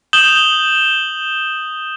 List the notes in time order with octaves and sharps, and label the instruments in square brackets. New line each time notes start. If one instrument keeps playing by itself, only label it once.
[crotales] D#6 G6 E7 F#7 G7